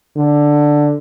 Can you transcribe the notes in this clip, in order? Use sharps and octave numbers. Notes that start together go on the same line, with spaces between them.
D3